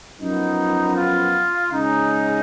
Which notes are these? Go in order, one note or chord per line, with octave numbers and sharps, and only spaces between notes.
F#2 F3 B3 D#4
F4
C#3 G#3 C#4 D#4